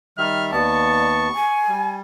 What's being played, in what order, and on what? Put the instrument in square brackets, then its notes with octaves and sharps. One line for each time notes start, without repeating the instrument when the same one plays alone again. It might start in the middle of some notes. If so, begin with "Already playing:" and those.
[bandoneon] D#3 G3 E5 [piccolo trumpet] F6
[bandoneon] D#2 B3 A5 [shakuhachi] D5 [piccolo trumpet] C#6
[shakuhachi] G#5
[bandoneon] G3